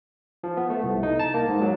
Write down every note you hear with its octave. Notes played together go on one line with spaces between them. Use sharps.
F3
B3
A3
C2
D#4
A5
A#3
G#2
F#3